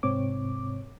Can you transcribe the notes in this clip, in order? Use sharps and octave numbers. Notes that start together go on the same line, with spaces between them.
G#2 C3 C4 C#5 D6